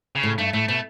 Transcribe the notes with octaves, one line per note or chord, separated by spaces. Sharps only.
C#3
A2
G2 A3
A2 A3
B2 A3